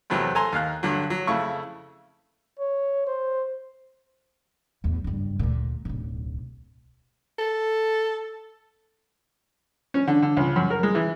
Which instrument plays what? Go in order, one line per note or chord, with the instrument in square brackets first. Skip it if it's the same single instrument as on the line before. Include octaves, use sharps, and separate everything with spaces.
[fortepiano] E2 C3 F#3 A3 B3 C4
A4 G#5 A#5 C6
D#2 F5 A#5 F#6
G2 D3 F#3
F#3
F2 C#3 A3 E4 C#6
[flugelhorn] C#5
C5
[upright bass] D1 E2
F#1 G2
D2 A#2
D1 B1
[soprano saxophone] A4
[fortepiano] C#4
D3
D3
C#2
F#2
A#4
G#3
E3